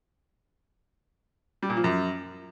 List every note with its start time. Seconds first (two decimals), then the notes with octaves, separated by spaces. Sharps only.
1.62 G3
1.70 A#2
1.77 F3
1.84 F#2